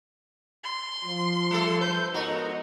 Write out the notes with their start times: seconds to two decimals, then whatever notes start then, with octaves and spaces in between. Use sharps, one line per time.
0.64 C6
1.05 F3
1.51 G3 A3 A4
1.81 B4 C5 G6
2.14 G#2 B3 D#4 F#4 A#4 D#5